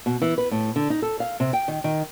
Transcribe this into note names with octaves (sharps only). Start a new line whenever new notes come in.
B2
E3
B4
A2
D3
D#4
A4
F5
C3
G5
D#3
D#3